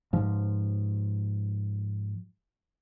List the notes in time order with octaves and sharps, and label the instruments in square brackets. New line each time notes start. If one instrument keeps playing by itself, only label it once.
[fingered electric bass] G#2 F3